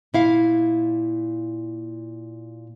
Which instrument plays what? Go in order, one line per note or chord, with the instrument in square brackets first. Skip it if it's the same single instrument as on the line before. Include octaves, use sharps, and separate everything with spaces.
[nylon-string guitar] A#2 E4 F5